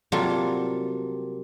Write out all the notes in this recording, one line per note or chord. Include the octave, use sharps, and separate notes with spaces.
C3 F#3 G3 A#3 F4 A4